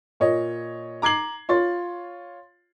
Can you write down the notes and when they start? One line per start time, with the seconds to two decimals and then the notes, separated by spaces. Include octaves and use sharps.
0.20 A#2 C#5 D#5
1.02 A#5 D6 G#6 C7 F#7
1.49 F4 C#5 C6 A6